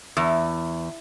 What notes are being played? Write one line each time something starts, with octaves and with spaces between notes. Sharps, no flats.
E2